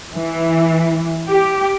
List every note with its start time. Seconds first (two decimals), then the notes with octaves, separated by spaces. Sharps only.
0.15 E3
1.29 G4